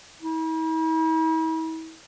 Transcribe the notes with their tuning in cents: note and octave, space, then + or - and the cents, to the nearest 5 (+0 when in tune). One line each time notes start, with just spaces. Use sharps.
E4 -45